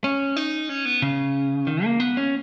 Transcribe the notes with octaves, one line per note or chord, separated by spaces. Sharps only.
C#4
D#4
C#4
B3
C#3
D#3
A#3
B3
C#4